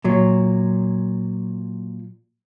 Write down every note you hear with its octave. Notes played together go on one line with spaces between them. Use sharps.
A#2 F#3